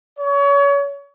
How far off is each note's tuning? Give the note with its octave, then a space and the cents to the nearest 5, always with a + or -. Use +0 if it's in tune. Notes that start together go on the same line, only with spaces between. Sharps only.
C#5 +30